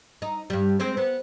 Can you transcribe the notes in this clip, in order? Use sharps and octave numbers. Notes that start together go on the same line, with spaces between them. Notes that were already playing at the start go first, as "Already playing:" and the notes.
D#4
G2 G3
G#3 C4 C5
B3